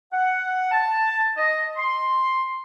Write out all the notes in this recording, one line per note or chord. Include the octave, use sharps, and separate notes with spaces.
F#5
A5
D#5
C6